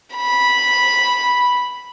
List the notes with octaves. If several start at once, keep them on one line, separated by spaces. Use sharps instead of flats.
B5